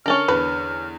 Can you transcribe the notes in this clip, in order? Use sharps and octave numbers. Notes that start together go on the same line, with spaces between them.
D3 C#4 A4 A#4 F6
E2 D3 B4